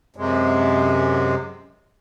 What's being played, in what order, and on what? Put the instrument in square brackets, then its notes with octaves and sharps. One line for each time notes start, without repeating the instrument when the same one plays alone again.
[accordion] F#2 C3 G#3